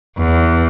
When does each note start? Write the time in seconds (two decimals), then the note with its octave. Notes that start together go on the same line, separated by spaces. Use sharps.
0.17 E2